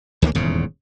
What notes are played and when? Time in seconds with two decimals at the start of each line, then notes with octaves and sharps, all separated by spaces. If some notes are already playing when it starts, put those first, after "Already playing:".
0.22 D2 D#3 G3 A#3
0.35 D#1 E2 G#2 C#3